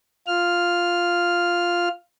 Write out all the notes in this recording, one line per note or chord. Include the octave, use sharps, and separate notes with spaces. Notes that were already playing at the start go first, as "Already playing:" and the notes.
F4 F6